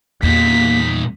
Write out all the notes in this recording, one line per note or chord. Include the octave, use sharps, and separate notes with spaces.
E2 A#2 A#3 D#4 B6